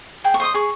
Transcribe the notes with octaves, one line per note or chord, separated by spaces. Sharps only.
G#4 G5
C#6
C5 D#5 D#6
G#4 C#6